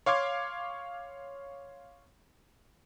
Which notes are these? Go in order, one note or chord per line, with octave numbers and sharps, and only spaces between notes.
C#5 F5 C6 D6 G#6